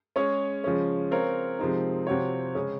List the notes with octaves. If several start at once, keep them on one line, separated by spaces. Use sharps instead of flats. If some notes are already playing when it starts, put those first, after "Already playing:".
G#3 C#4 G#4 C#5
C#3 F3 G#3 C#4
C4 F4 A#4 C#5
C3 F3 G#3 C4 D#4
C3 F3 C4 F#4 C#5
C#3 G#3 C#4 G#4